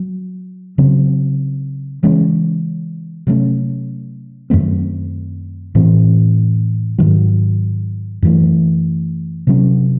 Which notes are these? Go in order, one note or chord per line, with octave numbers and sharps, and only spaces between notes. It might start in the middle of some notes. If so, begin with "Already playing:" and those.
Already playing: F#3
C#3 F#3 C4
C#3 E3 G#3 C#4
C3 F#3 A3 C#4
F#2 D#3 A3 C4
A2 E3 C4
G#2 D#3 F#3
F#2 E3 A3
C3 F#3 C#4